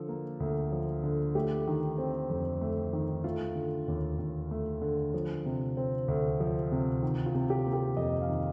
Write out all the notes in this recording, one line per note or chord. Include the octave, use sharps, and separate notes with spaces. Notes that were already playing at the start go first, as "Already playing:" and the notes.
Already playing: D3 F3 A4
A#3
D2
F3
D3
A3 G4
D#3
C4
F2
A3
D#3
A3 F4
D3
D#2
D#2
A3
D3
F3
C3
C4
D2
F3
C3
D#3
F4
C3
G4
A#3
G4
F2 D#5
F5
D#3